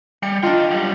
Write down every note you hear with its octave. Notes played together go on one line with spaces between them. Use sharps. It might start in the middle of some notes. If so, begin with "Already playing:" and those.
G3 C#7
D4 F4 D#5 G5
F#2 G3